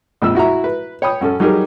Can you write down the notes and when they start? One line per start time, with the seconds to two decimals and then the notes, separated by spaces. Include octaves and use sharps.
0.22 A#1 F2 E6
0.35 E4 F#4 E5 A#5
0.64 B4
1.02 C#5 G5 B5 D#6
1.21 F#2 C#4 A4
1.40 F#3 G3 D#4 G4 G#4 A#4